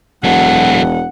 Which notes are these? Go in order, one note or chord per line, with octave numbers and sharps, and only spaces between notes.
E1 F#3 A4 F#5